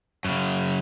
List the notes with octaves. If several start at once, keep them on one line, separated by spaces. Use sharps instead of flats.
F#2 C#3